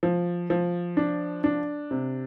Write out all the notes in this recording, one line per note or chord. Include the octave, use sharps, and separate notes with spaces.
F3
F3
D4
D4
C3